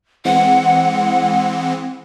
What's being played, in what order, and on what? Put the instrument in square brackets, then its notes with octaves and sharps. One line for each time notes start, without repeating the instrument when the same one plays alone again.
[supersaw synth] E3 G#3 C4 [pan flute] F#5